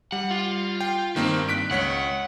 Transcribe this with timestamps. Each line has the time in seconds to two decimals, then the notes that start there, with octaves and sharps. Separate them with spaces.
0.12 G3 F#5
0.31 F4
0.81 G5
1.16 G2 D#3 A#3 C4
1.49 F#6 B6 D7
1.71 C#2 C#5 F#5 B6